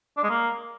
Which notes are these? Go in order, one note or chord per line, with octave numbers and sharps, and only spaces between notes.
D4
G#3
A#3